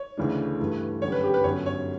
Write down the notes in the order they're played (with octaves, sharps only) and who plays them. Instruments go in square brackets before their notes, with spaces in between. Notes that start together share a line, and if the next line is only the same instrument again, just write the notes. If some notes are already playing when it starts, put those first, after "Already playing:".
Already playing: [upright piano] C#5
D2 C#3 E3 A3 D4
G2 E3 A3
F#2 D3 G3 C#5
B4
G4
B4
G1 F#2 D3 F#3 C#5
C#5